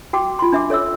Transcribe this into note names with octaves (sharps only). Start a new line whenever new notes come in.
F#4 G5 D6
F4 C6
D4 E5 D6
A4 C#5 E5 E6